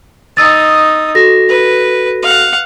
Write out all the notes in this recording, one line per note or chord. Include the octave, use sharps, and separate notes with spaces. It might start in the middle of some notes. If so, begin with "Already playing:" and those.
D#4 D#6 E6 A6
F#4 A4 A#6
B4
F5 F#5